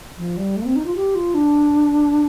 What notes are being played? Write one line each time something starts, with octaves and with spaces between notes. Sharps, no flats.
F3
G3
A3
A#3
C4
D#4
F4
G4
F4
D4